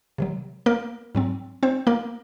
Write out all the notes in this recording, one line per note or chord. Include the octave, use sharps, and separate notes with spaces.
C3 D#3 F#3
A#3 A#4
G#2 F#3 C4
C4 C5
A#3 A#4